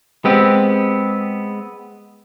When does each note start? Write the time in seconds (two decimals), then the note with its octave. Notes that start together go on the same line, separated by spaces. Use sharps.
0.25 G#3 B3 C4 G4